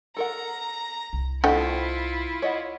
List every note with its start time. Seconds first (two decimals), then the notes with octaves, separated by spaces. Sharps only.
0.17 A4 A#4 F#5 A#5
1.13 C2
1.44 D3 A3 B3 E4 F4 C5 D#5 G5
2.42 C#5 D#5 F#5